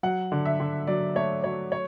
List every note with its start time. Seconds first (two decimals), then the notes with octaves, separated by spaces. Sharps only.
0.03 F#3 F#5
0.32 D3
0.45 E5
0.60 D3
0.87 F#3 D5
1.16 A3 C#5
1.44 F#3 C#5
1.72 C#5